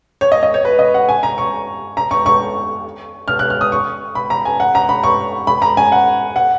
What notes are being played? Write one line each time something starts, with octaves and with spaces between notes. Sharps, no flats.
C#5
D#5
D#5
C#5
B4
D#5
F#5
G#5
A#5
C#6
A#5
C#6
C#6
F6
F#6
F6
D#6
C#6
B5
A#5
G#5
F#5
A#5
B5
C#6
B5
A#5
G#5
F#5
F#5